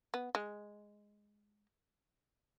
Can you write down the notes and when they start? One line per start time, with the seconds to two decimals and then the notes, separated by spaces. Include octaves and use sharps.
0.14 B3
0.35 G#3